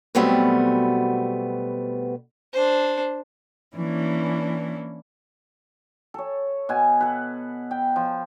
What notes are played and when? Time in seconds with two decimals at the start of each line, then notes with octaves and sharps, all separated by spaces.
0.15 B2 F#3 G3 A3 B3 C4
2.53 D4 C5
3.77 E3 A#3 C#4 D4 E4
6.14 A4 C#5
6.69 B2 B4 G#5
7.01 A4 B4
7.71 G5
7.96 F3